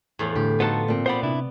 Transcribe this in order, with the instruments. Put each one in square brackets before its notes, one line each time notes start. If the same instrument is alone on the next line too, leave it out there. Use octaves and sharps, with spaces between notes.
[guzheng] E2 A2 F3 [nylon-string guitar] A3
[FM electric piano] A2 D3 [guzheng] G4
[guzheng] F3 [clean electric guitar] B3 A4 A5 [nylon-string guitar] D#4 F#4
[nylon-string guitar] A#2 C4
[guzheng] B3 D5 [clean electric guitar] C5 F#5 B5
[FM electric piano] C3 [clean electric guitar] D4 E4